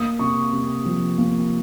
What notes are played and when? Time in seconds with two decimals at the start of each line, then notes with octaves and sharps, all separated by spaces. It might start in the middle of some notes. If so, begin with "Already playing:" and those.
Already playing: A#3 D#6
0.19 C3 C#6
0.53 C3
0.85 F3
1.18 A#3